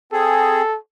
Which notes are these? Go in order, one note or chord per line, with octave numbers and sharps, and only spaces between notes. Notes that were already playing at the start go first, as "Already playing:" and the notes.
C4 G#4 A4